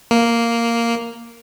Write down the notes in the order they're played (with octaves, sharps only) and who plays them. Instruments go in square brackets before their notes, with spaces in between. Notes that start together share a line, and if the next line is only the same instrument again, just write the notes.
[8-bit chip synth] A#3